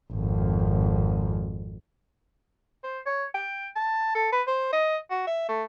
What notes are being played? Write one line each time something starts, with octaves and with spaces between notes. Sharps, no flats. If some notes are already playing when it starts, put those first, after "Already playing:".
G#1 F2
C5
C#5
G5
A5
A4
B4
C5
D#5
F#4
E5
A3